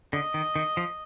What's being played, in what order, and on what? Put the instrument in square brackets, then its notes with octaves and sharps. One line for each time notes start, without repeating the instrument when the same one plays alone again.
[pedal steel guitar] D3 [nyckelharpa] D#5
[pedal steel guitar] D#3
D#3
F3